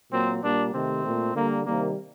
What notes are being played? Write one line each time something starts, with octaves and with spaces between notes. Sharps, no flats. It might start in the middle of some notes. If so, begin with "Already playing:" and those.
A#2 F#3 A#3 C4
A#2 G3 A#3 D4
C3 D#3 A3 C4
A#2 A3
D3 G3 A#3
C3 D#3 G3 A#3